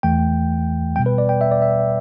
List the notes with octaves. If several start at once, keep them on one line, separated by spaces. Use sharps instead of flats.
E2 E3 A3 G5
B2 G3 B3 G5
B4
D5
G5
E5
D5
E5